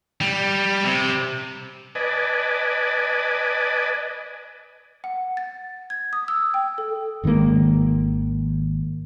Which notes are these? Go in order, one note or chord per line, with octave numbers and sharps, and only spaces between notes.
G3
C3
B4 D5 D#5 G#5 A5
F#5
A6
G#6
D#6
E6
G5
A4
G#1 D#3 G#3 A#3